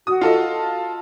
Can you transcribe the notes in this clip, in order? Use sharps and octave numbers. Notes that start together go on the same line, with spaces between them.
F#4 D#6
F4 A4 D#5
A5